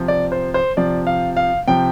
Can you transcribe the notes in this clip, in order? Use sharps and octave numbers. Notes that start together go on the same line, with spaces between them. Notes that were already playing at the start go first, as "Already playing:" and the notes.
Already playing: C3 F3
D5
C5
C5
C3 F3 D5
F5
F5
C3 F3 G5